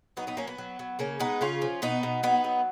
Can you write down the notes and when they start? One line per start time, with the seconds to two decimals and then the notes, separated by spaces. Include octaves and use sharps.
0.17 F#3 B3 D#4
0.27 B3 D#4
0.37 F#3 A#3 C#4
0.47 B3
0.58 F#3
0.79 F#3
0.99 C#3 A#3 C#4
1.20 G#3 B3 D#4
1.41 C#3 C#4 F4
1.62 F3
1.82 B2 B3 D#4
2.03 B2
2.23 F#3 B3 D#4
2.44 F#3